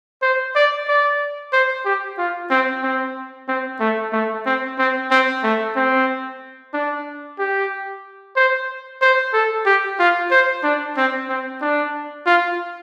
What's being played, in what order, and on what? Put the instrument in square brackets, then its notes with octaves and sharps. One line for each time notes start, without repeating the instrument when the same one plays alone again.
[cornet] C5
D5
D5
C5
G4
F4
C4
C4
C4
A3
A3
C4
C4
C4
A3
C4
D4
G4
C5
C5
A4
G4
F4
C5
D4
C4
C4
D4
F4